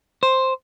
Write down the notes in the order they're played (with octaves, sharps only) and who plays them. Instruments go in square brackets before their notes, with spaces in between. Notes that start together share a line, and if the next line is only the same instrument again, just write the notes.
[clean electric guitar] C5